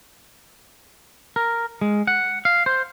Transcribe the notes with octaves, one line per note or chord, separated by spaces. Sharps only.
A#4
G#3
F#5
F5
C5